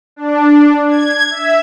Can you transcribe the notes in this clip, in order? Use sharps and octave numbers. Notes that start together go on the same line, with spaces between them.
D4
G#6
E5